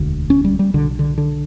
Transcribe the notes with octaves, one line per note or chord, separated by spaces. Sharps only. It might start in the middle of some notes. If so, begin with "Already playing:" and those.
Already playing: E1 D2 D3
C#4
G3
G3
B1 B2 D3
D3
D3